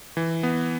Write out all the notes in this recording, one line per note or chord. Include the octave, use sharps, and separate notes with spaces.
E3
B3